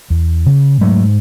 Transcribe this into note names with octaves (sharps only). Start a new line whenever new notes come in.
E2
C#3
G#2 F#3 A3